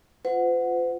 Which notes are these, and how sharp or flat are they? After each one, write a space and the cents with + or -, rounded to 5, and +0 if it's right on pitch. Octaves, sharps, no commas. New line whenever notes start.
F4 +0 C5 -45 F#5 -10